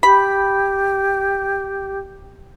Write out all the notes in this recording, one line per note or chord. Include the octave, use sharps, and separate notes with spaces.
G4 B5